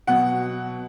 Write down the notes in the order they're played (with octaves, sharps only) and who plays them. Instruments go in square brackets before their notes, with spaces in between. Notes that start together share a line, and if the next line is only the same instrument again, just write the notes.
[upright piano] B2 F#3 F#5